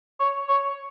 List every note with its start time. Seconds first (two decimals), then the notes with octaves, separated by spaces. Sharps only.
0.20 C#5
0.48 C#5